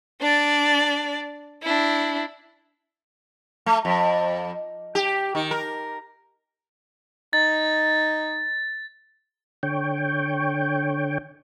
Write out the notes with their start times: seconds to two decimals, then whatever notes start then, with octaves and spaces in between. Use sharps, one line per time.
0.21 D4 D5
1.63 D4 E4
3.66 A3
3.85 F2
4.95 G4
5.35 D#3
5.51 A#4
7.33 D#4 A6
9.63 D3 C#5 G5